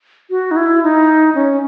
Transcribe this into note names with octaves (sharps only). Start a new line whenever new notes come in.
F#4
D#4
E4
D#4
C#4